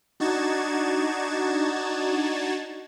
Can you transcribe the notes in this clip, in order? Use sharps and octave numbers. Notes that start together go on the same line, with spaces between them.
D4 D#4 F#4 G#6 A6 E7